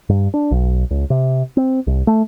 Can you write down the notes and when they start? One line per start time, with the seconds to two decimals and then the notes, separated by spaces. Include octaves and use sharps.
0.09 G2
0.34 D4
0.51 B1
0.91 C#2
1.10 C3
1.57 C4
1.87 C2
2.07 A3